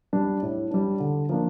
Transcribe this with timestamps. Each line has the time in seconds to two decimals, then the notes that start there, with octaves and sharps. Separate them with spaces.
0.13 G3 D4
0.43 A2
0.71 G3 D4
1.00 D3
1.29 F3 A#3 D4